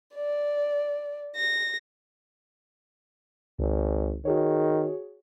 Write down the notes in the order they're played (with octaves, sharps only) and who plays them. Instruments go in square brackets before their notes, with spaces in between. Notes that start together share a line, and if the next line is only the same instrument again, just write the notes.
[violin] D5
A#6
[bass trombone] G#1 [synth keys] C#2
[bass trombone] D#3 [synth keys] F#4 G#4 C#5